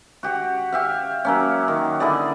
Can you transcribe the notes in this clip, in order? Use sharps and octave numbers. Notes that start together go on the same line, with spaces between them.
F#4 G4 F#5
G4 E5 F5
F#3 A#3 C#4
D#3
D3 E4 G#4 D5